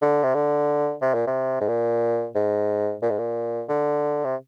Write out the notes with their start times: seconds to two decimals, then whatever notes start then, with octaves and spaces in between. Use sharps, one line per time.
0.02 D3
0.24 C3
0.35 D3
1.02 C3
1.14 A#2
1.27 C3
1.61 G#2
1.68 A#2
2.35 G#2
3.02 A#2
3.10 G#2
3.18 A#2
3.69 D3
4.25 C3